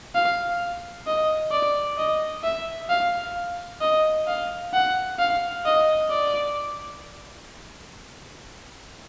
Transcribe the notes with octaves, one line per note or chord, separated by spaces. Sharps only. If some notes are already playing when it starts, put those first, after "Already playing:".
F5
D#5
D5
D#5
E5
F5
D#5
F5
F#5
F5
D#5
D5